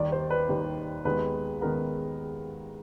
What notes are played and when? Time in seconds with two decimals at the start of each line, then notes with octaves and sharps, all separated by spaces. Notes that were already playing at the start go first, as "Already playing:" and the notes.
Already playing: D#2 D#3 G3 D5
0.12 C5
0.30 B4
0.49 D#2 D#3 G3
1.05 D#2 D#3 G#3 B3 B4
1.61 D#3 G#3 B3 A#4